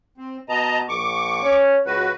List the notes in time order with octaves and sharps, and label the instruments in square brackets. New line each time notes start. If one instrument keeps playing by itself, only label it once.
[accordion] C4
[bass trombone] B2 [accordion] D#5 A5 A#5
[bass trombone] A#1 [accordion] C#6 D6
[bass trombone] C#4
[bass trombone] C#2 [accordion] F#4 B4